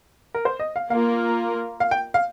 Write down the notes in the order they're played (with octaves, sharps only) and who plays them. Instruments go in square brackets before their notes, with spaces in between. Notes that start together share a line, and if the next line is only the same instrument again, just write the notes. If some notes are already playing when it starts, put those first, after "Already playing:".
[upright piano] A#4
C5
D#5
F5
[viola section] A#3 F4 A#4 [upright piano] F5
[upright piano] F5
G5
F5